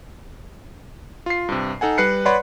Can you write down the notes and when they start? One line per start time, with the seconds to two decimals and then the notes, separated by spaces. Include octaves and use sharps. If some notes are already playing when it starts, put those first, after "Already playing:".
1.26 F4 C7
1.49 G2 C3
1.81 D#4 A4 F#5 G#5
1.98 G3 B4 F#6 C7 C#7
2.25 B4 C#5 D5 F#5 B5 C6